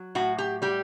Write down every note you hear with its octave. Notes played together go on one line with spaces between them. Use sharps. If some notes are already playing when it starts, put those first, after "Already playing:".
Already playing: F#3
A2 F#4
G4
G3 G4